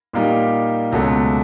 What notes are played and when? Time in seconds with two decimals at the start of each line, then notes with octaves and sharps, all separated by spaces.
0.13 A#2 G3 A#3 D#4 G4
0.92 C#2 B2 F#3 A3